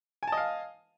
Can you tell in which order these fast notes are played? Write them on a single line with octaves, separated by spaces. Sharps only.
G#5 A5 D#5 F5